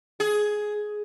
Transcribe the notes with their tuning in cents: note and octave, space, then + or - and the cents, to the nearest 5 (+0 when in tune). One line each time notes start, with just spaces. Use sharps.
G#4 +10